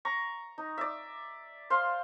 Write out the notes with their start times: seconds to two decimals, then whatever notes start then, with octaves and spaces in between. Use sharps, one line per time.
0.05 A#5 C#6
0.58 D#4
0.78 D5 E5
1.70 C5 F5 C6